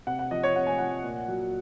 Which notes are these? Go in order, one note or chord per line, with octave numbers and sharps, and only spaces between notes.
C3 F#5
F#5
F3 D#5
C#5
C3 F#5
G#5
F3 F#5
A#2
F#3